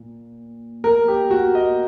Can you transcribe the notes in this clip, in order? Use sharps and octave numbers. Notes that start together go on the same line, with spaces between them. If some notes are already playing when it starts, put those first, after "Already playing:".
Already playing: A#2
A#4
G4
F#4
D#5